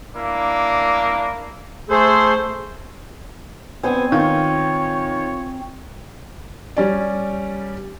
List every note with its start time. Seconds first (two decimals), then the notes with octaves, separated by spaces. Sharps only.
0.14 A#3 D4 E4
1.90 A3 G#4 A4 C5
3.83 B3 C4 D4 C5 G#5
4.12 D#3 F4 C#5
6.77 G3 C#4 D5